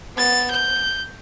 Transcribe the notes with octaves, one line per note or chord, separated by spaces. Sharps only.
B3 A6
G6